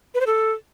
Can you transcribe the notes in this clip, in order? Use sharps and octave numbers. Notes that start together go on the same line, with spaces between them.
B4
C5
A4